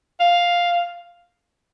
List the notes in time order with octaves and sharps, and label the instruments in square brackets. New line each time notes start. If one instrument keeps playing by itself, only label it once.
[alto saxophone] F5